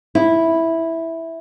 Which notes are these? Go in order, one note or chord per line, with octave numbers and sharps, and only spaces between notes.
E4